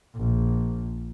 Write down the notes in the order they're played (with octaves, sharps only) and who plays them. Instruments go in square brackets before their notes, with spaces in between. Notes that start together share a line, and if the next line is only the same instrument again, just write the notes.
[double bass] A#1